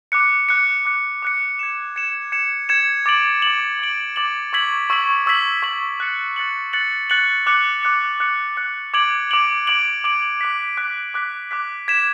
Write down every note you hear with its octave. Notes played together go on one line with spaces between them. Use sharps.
D6 F#6 C#7
D6 F#6 C#7
D6 F#6 C#7
D6 F#6 C#7
G#6 C#7 E7
G#6 C#7 E7
G#6 C#7 E7
G#6 C#7 E7
D6 A6 D7 F#7
D6 A6 D7 F#7
D6 A6 D7 F#7
D6 A6 D7 F#7
C#6 E6 G#6 B6 F#7
C#6 E6 G#6 B6 F#7
C#6 E6 G#6 B6 F#7
C#6 E6 G#6 B6 F#7
F#6 A6 C#7 F#7
F#6 A6 C#7 F#7
F#6 A6 C#7 F#7
F#6 A6 C#7 F#7
D6 F#6 C#7
D6 F#6 C#7
D6 F#6 C#7
D6 F#6 C#7
D6 G#6 D7 F#7
D6 G#6 D7 F#7
D6 G#6 D7 F#7
D6 G#6 D7 F#7
D6 F#6 B6
D6 F#6 B6
D6 F#6 B6
D6 F#6 B6
G#6 B6 E7